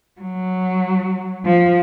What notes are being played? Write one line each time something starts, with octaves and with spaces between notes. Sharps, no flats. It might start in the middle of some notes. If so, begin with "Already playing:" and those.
F#3
F3